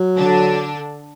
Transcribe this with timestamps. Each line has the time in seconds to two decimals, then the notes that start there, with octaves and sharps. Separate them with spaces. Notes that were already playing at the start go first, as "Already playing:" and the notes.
Already playing: F#3
0.16 D3 D4